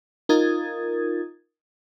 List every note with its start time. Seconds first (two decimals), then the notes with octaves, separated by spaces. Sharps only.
0.29 D#4 F4 A#4 D#6 G#6 A6